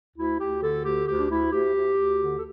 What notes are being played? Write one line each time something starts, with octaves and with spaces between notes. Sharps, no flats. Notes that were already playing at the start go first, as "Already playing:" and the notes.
D2 E4
D2 G4
D3 A4
D2 G4
D2 G4
D4
D2 E4
D2 G4
D2
D2
D3
A4